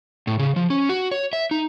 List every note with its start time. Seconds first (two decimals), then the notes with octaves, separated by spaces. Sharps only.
0.27 A2
0.39 C#3
0.56 F3
0.70 C#4
0.89 F#4
1.11 C#5
1.33 E5
1.51 D#4